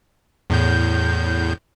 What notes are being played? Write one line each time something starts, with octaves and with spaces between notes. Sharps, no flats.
E2 A2 G6